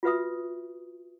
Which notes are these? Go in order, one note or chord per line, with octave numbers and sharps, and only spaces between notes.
F4 F#4 B4 E5 D#6